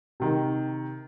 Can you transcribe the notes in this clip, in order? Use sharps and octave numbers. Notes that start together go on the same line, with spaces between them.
C3 D#3